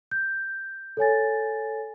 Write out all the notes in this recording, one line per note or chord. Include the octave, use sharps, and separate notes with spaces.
G6
A4 C#5 G#5 A6